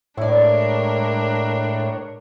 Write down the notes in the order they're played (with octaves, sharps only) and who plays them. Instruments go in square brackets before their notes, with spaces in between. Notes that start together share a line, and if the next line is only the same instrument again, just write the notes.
[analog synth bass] A2 [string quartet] G#3 D4 A#4 [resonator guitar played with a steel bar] E4 D5 [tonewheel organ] C#5